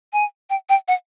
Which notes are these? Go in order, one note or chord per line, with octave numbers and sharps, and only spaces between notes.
G#5
G5
G5
F#5